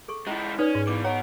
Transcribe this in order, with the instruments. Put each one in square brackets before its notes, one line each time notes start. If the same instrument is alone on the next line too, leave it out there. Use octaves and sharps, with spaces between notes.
[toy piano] G#4 A4 C#6
[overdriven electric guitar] G#3 E4 [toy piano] C#4 F4 A#5
[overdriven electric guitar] C#4 [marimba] D#4 [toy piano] B4 D5
[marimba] G#2
[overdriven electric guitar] B2 E3 [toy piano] D6
[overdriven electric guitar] B2 F#5 [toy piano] C#5 A#5